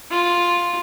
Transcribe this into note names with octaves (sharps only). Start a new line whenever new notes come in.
F4